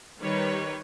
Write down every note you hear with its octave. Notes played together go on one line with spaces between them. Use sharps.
D#3 G3 B4 C#5